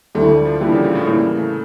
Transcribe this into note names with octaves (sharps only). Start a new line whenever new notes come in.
D2 D3 G3 A3 E4 A4
G3
F3
D3 E3 G3 A#3 E4 G4
C#3
A#2
A2
C#3 E3 G3 A#3
A3